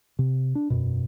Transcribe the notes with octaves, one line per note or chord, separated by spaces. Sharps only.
C3
D4
E1 F#2 B2